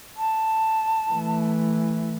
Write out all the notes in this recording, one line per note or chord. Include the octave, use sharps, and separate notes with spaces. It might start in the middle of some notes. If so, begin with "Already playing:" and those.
A5
E3 A3